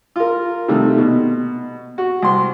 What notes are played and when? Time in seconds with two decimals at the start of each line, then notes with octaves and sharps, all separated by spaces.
0.16 F4 A#4
0.68 C3 D#3 G3 A3
0.98 B2
1.98 F#4
2.22 C2 C6